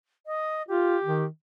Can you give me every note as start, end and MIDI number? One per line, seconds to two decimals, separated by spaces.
0.26 0.62 75
0.68 0.97 65
0.68 1.24 67
1.03 1.27 51